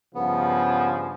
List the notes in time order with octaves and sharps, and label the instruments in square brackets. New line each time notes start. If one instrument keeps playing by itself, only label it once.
[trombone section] G2 C#3 F3 [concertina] B3